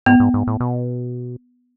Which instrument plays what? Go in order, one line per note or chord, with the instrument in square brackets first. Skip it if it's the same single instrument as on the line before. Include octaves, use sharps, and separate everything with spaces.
[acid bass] G#2 [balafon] B3
[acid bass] G#2
G#2
A2
B2